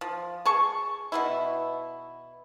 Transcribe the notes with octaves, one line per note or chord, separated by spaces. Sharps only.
F3
G#4 A5 C#6
B2 B3 E4